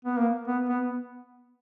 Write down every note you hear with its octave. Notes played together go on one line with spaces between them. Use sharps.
B3
A#3
B3
B3